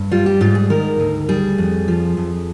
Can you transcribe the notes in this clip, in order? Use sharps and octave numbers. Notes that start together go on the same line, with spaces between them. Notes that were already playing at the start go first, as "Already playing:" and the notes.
Already playing: G2
G3 F4
G4
G#2 F4
G#4
D#3 A#4
D2
G3 G#4
F2
F3
F2